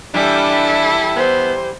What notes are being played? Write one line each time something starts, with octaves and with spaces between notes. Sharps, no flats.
E3 G3 D4 E4 A4
B3 C5